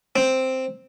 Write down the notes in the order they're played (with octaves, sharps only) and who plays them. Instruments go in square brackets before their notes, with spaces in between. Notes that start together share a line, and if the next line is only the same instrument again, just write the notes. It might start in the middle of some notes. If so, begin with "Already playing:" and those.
[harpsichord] C4